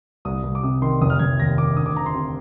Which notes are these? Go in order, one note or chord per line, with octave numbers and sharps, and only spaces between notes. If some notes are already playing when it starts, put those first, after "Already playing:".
C2 D#6
C2
D6
C3 D#6
D#3 C6
F1 D#6
F6
F1 G#6
D#2 A#6
D#3 D6
D2 D#6
D6
D2 A#5
C6
C3